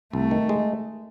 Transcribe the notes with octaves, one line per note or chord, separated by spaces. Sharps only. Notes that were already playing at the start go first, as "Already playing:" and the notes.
C2 A3
D#3
G#3